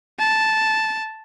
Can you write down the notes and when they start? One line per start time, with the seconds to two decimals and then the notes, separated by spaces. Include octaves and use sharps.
0.19 A5